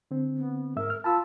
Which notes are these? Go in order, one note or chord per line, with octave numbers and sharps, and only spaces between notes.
D3 C4
B3
G#2 A#4 E5 E6
F6
F4 A5 B5 E6